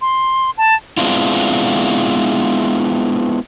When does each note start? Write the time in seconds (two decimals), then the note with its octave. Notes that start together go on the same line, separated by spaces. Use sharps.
0.01 C6
0.58 A5
0.97 G#3 B3 C4 D4 E4 F4